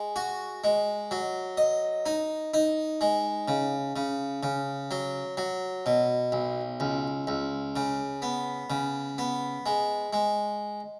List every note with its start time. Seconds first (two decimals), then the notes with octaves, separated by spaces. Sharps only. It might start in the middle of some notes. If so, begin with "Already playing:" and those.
Already playing: G#3
0.16 F#4
0.64 G#3
1.11 F#3
1.57 D#5
2.06 D#4
2.54 D#4
3.01 G#3
3.48 C#3
3.96 C#3
4.43 C#3
4.91 F#3
5.37 F#3
5.86 B2
6.32 B1
6.80 C#2
7.27 C#2
7.76 C#3
8.22 B3
8.70 C#3
9.18 B3
9.66 G#3
10.13 G#3